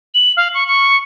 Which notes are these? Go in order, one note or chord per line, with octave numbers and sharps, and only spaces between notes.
F#7
F5
C#6
C#6